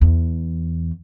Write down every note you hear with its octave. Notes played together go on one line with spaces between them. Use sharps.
E2